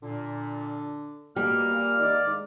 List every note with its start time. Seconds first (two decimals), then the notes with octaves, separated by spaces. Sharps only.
0.02 A#2 D3
1.36 B2 G3 A#3 F6
1.71 A#2
2.00 D#3 D5
2.27 G#2